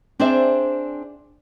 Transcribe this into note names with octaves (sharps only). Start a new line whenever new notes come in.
C4 D4 G#4 C5 D5 E5